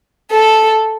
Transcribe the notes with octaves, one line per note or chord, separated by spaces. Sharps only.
A4